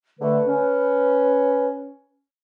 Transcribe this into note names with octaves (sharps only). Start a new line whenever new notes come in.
D3 A3 B4
C#4